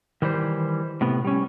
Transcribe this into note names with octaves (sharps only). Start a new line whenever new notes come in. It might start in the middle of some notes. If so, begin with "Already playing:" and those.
D#3 E3 G3 C5
A2 C3 B3
G3 C#4